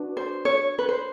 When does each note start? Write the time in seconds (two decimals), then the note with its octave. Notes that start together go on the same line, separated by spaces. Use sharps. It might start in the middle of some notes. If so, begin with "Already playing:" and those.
Already playing: D4 F#4 B4
0.17 C5
0.45 C#5
0.79 B4
0.89 C5